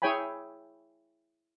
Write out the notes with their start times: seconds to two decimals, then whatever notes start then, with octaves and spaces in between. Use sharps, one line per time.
0.02 E4 G#4 C#5 G5 G#5 B5